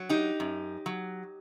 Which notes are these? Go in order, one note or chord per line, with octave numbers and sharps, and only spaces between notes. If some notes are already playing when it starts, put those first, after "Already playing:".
Already playing: F#3
D#4 G4
F#2
F#3